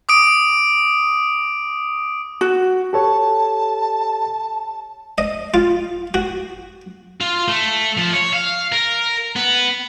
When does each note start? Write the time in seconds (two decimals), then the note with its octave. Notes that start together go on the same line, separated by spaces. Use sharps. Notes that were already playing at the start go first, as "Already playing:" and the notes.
0.09 D6 D#6 D7
2.41 F#4
2.93 G4 A4 C#5 A5
5.18 D#5
5.54 F4
6.14 F#4
7.21 F4
7.48 A3
7.97 F3
8.13 C#5
8.33 F5
8.72 A#4
9.36 B3